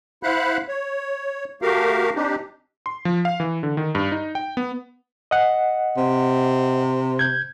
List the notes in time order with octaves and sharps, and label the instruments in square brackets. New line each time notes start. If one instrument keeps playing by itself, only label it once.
[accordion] E4 C5 F5 F#5 B5 F#6
C#5
A3 F#4 G4 A#4 F5
C4 D4 D#4 G4
[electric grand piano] C6
F3
F5
E3
D3
D#3
G2
D#4
G5
B3
[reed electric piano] D#5 F#5
[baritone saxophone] C3
[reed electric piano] G6 G#6